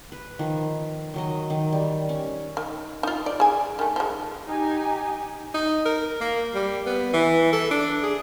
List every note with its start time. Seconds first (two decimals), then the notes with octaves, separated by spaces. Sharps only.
0.12 B4
0.39 D#3 F3
1.14 D#3 F#3 D#5
1.50 D#3
1.72 G3
2.09 C#4
2.57 D#3
3.03 D#4 F4
3.26 D5
3.40 G#4 G#5
3.79 D#3 A3
3.96 F3 G#3
4.46 D#4 G4 G#5
5.54 D#4
5.85 A#4
6.20 A#3
6.55 G3
6.86 B3
7.13 E3
7.53 A4
7.71 D4
8.03 G#4